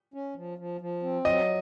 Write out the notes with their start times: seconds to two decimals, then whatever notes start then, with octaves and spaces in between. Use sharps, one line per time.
0.14 C#4
0.36 F3
0.58 F3
0.81 F3
1.03 C4
1.25 F#3 D#5